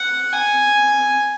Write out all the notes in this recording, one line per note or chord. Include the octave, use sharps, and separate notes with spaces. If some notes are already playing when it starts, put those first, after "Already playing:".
Already playing: F#5
G#5